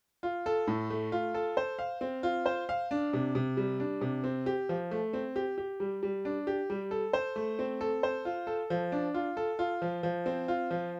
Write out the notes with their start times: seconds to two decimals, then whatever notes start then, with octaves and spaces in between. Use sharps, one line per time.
0.23 F4
0.46 A4
0.68 A2
0.90 A3
1.12 F4
1.34 A4
1.57 C5
1.79 F5
2.01 C4
2.23 F4
2.46 C5
2.69 F5
2.91 D4
3.13 C3
3.35 C3
3.57 G3
3.80 D4
4.01 C3
4.24 C4
4.46 G4
4.69 F3
4.91 A3
5.13 C4
5.36 G4
5.58 G4
5.80 G3
6.03 G3
6.25 D4
6.47 G4
6.70 G3
6.91 A4
7.13 C5
7.36 A3
7.59 C4
7.81 A4
8.03 C5
8.25 F4
8.47 A4
8.70 F3
8.92 D4
9.14 F4
9.37 A4
9.59 F4
9.82 F3
10.03 F3
10.26 C4
10.48 F4
10.71 F3